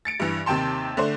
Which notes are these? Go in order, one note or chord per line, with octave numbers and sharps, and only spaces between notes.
A6 C#7 D7
G2 E3
D#2 C3 D#3 G5 A5 C6
D3 A3 D4 C5